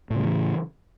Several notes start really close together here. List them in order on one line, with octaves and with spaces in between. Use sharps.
A2 C#3 G3 E3